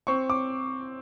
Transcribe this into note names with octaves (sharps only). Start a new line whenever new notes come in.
C4 C#6
D6